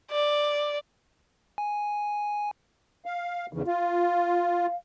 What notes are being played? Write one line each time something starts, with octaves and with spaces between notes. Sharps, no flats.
D5
G#5
F5
E2 G#2 C#3 E3
F4 F5